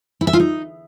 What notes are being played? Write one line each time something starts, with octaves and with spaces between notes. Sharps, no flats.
E4
E5
F4
D#4